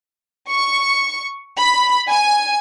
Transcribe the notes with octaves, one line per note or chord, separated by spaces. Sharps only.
C#6
B5
G#5